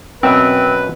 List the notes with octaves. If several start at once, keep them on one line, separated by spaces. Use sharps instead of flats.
F#2 B2 C4 B4 E5